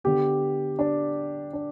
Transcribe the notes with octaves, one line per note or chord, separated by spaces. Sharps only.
D3 B3 G4
D4
D4